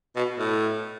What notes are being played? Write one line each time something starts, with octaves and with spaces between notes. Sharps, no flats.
B2
A2